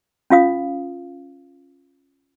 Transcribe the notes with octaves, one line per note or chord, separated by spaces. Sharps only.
C#4 F4 F5 D#6